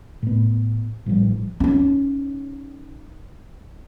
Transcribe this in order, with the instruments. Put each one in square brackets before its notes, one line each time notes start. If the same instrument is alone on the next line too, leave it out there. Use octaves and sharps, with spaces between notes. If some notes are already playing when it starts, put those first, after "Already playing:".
[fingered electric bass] A2 B3
A1 F3 G3
[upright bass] C#4 D#4